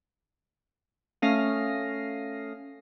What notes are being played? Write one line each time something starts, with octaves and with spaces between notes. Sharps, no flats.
A3 C#4 F5 D#6 A#6 C7